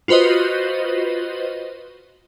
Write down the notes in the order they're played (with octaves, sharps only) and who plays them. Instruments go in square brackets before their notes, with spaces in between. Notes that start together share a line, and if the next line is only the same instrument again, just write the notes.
[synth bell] F4 F#4 B4 C5 D#5